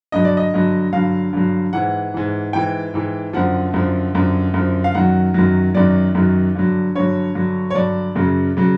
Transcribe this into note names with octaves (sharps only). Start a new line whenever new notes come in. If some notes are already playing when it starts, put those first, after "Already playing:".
G2 D3 F#3 D#5
D5
D#5
G2 D3 F#3
G2 D3 F#3 F5
G2 D3 F#3
G#2 E3 F#5
G#2 E3
G#2 E3 G5
G#2 E3
F#2 D3 F3 F#5
F#2 D3 F3
F#2 D3 F3
F#2 D3 F3
F5
F#2 D#3 F#3 F#5
F#2 D#3 F#3
F#2 D#3 F#3 D5
F#2 D#3 F#3
G2 D3 F#3
G2 D3 F#3 C#5
G2 D3 F#3
C#5
G2 D3 F#3 D5
F#2 C#3 F#3
C#3 F#3